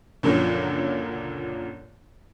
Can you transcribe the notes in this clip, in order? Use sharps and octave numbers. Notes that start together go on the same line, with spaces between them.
C#2 F#2 A#2 D3 F3 F#3